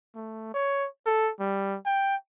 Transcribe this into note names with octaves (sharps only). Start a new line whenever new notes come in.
A3
C#5
A4
G3
G5